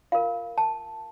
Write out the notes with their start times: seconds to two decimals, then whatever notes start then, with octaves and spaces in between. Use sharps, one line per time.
0.12 F4 A#4 F5
0.58 A5